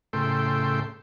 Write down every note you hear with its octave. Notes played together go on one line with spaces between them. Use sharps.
A2 C#3 A4 G5 C6